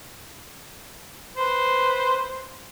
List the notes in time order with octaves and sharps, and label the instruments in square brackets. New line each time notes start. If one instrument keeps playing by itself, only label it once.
[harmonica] B4 C5